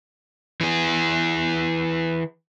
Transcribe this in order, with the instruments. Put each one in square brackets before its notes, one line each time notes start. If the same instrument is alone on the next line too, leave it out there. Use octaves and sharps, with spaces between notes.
[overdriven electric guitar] E3 G#4